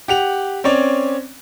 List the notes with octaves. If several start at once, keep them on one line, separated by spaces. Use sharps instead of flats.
G4 F#5 F7
C4 C#4 C#5 D5